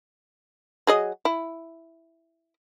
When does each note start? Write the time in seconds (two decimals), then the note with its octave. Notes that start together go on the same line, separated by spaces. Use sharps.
0.87 F#3 G#4 D#5
1.25 E4